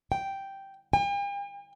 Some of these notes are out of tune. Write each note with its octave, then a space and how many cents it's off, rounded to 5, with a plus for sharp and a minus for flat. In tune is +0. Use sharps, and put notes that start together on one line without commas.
G5 -5
G5 +45